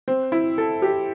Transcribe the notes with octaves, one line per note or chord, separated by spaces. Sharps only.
C4
E4
A4
G4